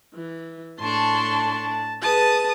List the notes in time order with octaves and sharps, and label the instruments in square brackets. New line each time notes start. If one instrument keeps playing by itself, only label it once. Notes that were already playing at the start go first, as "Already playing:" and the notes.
[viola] E3
[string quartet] A2 D4 [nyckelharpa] A5 [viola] C6 C#6
[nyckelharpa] G#4 B4 [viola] A5 [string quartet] D#6